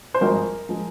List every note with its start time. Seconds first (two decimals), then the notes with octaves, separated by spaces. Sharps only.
0.14 C5
0.21 G#1 G2 F3 G#3 A#4
0.69 F3 G#3